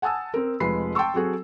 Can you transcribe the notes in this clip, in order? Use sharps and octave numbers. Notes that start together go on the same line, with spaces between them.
F#5 G#5 A5 D#6 E6
C4 A#4
F1 F3 G#3 B4 B5 C7
G5 A5 C6 C#6 E6
F#3 C4 F#4 G#4 A4